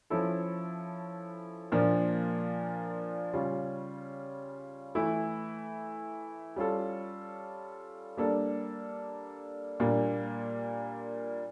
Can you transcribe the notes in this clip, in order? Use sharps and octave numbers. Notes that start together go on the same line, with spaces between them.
F3 C#4 E4 A4
A#2 F3 A#3 D4
C#3 G3 C#4 F4
E3 A3 E4
G3 C#4 F4 A4
G3 A#3 D4 A4
A#2 G3 A#3 D4